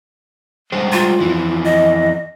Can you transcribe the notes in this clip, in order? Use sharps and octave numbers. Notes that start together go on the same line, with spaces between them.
G3 G#3 C5
F4
F2 E3
D#5